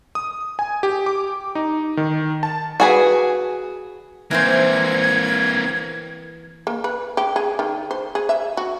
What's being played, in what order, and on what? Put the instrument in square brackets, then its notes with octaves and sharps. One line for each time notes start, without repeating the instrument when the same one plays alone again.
[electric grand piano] D#6
G#5
G4
D6
D#4
D#3
A5
[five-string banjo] F#4 G#4 B4
[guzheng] E3 E4 C5 [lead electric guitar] A#3 C4 [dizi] G#6
[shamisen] A#3
B4
G4
G#4
D#3
C5
G#4
E5
F#4